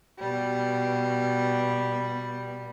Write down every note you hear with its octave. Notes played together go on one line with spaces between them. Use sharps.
B2 G3